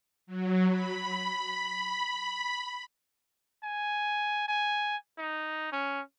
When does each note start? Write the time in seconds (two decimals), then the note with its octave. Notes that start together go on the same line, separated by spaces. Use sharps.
0.27 F#3
0.69 B5
3.63 G#5
4.48 G#5
5.18 D#4
5.72 C#4